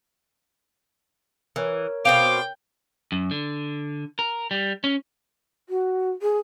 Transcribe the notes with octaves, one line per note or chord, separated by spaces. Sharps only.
E3 A#4 C#5
B2 C5 F5 G5 D6
F#2
D3
A#4
G3
C#4
F#4
G#4